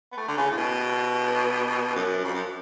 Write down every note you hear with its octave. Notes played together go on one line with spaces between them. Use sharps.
B3
A3
D3
C#3
A2
B2
F#2
F2
F#2